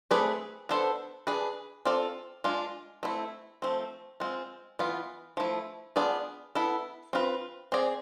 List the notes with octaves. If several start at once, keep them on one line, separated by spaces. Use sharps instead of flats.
A3 C4 G#4 B4 D5
B3 D4 A4 C5
D4 G#4 B4
C4 F4 A4 D5
G#3 D4 F4
A3 C4 E4
F3 A3 C4
G#3 C4 F4
E3 B3 F4
F3 A3 E4
B3 D4 F4 G#4 D5
B3 E4 A4
C4 F4 B4
C4 G#4 D5